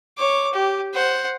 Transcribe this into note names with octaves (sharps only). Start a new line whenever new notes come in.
C#5 D6
G4
C5 F#5